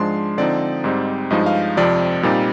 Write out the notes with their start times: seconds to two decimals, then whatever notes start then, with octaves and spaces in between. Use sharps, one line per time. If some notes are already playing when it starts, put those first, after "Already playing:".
Already playing: G#2 F3 G#3 D4 C6
0.38 D3 F3 C4 D#4 D5
0.84 G#2 G3 C4 D#4
1.30 G2 F3 G#3 D#4 D#5
1.46 F5
1.77 F2 C3 F3 C4 D5
2.23 A#2 G3 C4 D#4